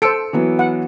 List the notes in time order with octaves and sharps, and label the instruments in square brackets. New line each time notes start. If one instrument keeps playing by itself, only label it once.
[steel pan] A4 C5 [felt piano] E6 C#7 D7
[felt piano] E3 F#3 B3
[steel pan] F#5